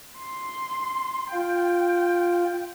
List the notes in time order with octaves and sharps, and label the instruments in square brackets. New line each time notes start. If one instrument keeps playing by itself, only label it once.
[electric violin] C6
[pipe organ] F4 [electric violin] G5